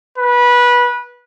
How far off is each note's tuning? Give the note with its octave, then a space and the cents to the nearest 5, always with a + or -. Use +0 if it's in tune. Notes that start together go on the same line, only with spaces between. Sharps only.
B4 -20